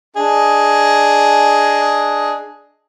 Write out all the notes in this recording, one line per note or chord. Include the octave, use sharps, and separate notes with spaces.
D4 G#4 D#5